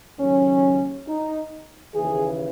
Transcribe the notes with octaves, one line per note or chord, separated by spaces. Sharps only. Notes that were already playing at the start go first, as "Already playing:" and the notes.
D#2 C#3 F#3 C#4
D#4
D#2 C#3 E3 G#4